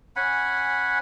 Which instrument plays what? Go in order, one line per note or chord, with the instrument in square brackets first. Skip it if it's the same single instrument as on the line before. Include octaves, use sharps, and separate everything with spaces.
[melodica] C#4 F#5 G#5 B5